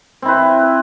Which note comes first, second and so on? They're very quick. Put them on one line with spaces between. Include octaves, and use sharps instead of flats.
C4 E4 B4